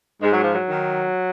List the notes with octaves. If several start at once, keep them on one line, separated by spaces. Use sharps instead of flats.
G#2 G#3
F#3
F3
F#3
D#3